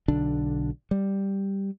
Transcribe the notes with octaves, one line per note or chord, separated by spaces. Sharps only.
B1 D3 D4
G3